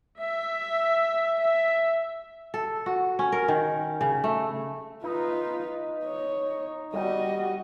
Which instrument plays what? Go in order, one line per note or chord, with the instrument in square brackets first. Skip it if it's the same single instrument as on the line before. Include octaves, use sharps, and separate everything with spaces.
[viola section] E5
E5
[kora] A4
F#4
C#4
A#4
D#3
C#3
A3
[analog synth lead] D#4 [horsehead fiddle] F4 B4
[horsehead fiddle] C#5
[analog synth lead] G3 [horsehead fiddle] F#4 D#5